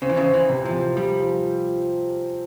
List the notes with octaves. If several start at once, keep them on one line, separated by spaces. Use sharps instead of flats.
C#3 C4
E3
C#3
C4
E3
C3
F3
C3
F3 G3
F3